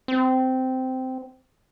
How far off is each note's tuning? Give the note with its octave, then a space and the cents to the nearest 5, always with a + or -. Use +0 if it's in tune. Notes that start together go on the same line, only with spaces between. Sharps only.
C4 -15